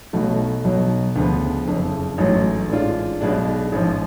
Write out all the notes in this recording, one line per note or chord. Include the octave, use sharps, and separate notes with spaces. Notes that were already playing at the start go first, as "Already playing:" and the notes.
B1 B2 F#3 A3
B1 B2 F#3
D2 C#3 F3 B3
F#1 F2 C#3
A1 G#2 F#3 A3
A1 G#2 G#3 D4 F4
B1 B2 G#3 D4
A1 G#2 F3